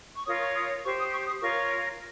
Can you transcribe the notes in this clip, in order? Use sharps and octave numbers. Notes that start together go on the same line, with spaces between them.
C#6
F4 A#4 C#5 D#6
C#6
D#6
G4 C5 C#6
D#6
C#6
D#6
F4 A#4 C#5 C#6